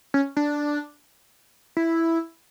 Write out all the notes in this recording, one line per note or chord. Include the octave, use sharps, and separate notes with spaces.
C#4
D4
E4